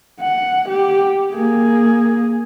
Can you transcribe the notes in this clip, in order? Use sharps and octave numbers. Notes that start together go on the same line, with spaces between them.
F#5
G4
A#3 G#4